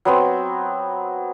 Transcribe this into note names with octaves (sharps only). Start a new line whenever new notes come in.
F#3 B3 C4